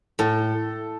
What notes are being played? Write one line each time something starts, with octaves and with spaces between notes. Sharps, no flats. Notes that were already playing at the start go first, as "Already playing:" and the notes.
A2 A4